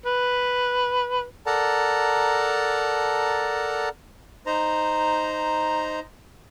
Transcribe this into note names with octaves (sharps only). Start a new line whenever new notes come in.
B4
A4 A#4 D5 F#5 A5 A#5
D#4 C5 A#5